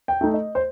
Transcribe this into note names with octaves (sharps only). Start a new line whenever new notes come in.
G5
A3 D#4
D#5
C5